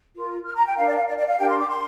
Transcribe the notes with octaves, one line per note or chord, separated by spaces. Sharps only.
F4 A#4
F6
A#5
G5
D4 A#4 F5
D5
F5
D5
D5
F5
D4 G4 A#4 G5
C6
D6
C6